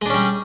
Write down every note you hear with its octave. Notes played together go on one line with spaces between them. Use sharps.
G3 G#3 C#4 D4